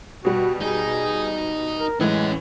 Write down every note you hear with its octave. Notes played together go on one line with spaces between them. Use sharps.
B2 G3 F#4
D#4 G#4
A#4
A2 E3 G#3 C#4 F#5